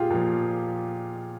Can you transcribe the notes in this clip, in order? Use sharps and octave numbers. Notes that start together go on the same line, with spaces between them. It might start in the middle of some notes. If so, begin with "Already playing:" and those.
Already playing: A#2 F4 G4 G#4
A#2 F3